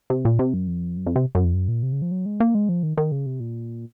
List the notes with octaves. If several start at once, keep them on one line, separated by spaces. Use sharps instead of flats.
C3
A#2
C3
F#2
F2
F#2
F2
C3
F#2
F2
F#2
A#2
C3
C#3
F3
F#3
G#3
A#3
G#3
F3
D#3
D#3
C#3
C3
A#2